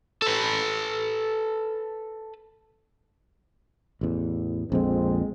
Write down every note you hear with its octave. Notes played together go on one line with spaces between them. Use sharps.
A4 B4
A1 E2
A#1 F2 F3 G#3 C4